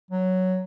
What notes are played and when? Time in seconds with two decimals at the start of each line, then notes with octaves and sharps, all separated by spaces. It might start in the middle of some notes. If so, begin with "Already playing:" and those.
0.10 F#3